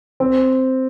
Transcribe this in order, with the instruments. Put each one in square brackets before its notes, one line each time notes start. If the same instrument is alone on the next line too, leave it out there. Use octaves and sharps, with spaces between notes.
[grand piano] C4